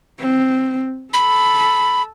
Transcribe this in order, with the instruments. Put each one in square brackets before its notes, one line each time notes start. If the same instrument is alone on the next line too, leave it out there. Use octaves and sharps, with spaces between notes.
[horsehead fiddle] C4
[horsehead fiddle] A4 [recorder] B5